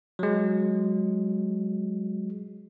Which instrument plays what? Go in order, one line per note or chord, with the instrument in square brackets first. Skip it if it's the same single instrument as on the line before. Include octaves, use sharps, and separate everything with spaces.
[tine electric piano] F#3 G#3